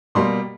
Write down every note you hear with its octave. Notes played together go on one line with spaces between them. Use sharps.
B2 G3 A#3 C6